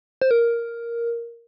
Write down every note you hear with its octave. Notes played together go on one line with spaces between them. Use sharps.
C5
A#4